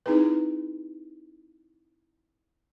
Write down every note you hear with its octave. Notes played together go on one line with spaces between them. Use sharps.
C4 D#4 E4 G#4 B4